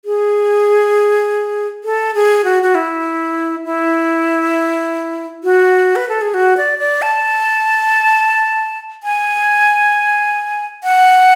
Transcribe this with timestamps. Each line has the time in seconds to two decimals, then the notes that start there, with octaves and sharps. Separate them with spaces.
0.05 G#4
1.84 A4
2.15 G#4
2.45 F#4
2.63 F#4
2.75 E4
3.65 E4
5.44 F#4
5.96 B4
6.09 A4
6.21 G#4
6.34 F#4
6.57 D5
6.79 D5
7.02 A5
9.03 G#5
10.84 F#5